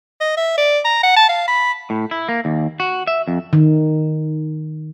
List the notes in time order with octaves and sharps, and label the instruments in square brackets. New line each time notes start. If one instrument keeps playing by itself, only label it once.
[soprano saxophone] D#5
E5
D5
A#5
F#5
A5
F5
B5
[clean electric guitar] A2
E4
A#3
D#2
F#4
E5
F2
[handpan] D#3